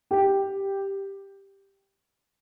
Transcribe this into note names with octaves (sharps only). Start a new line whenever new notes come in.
G4